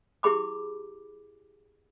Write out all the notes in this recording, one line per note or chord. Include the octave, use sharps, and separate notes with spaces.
E4 G4 G#4 B5 D6